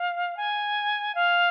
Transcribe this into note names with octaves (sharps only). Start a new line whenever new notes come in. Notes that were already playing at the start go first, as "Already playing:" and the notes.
Already playing: F5
G#5
F5